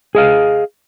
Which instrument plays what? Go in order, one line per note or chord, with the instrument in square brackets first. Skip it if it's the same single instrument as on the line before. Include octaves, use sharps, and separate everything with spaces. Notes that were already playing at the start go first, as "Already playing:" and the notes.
[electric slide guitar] G#4 D#5 F5